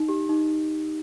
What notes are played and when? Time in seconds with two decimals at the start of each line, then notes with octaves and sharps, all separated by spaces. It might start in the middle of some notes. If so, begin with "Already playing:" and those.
Already playing: D#4
0.09 G4
0.29 D#4